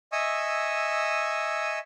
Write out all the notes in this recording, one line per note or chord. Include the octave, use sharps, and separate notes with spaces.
D#5 E5 G#5 C#6 D#6 E6